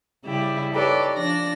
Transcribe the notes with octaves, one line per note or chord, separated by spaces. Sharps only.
C#3 G3 E4 G4
D#4 G4 A4 B4 C#5 D5
F3 D4 D5 A#6